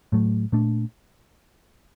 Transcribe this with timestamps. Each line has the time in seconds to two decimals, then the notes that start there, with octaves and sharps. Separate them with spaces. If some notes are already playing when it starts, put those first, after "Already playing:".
0.12 A2 F#3 A3
0.52 A#2 A3 D4